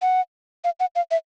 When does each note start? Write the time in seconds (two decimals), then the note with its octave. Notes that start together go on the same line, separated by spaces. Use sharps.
0.02 F#5
0.64 F5
0.80 F#5
0.96 F5
1.11 E5